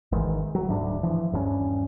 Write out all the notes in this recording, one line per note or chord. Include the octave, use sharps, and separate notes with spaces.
G#1 G#2 D#3 E3
F#3
D1 D2 G#2 D4
E3 F3
D#1 G2 A#2 C#4